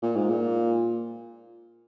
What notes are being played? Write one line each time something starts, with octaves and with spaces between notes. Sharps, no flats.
A#2
G#2
A#2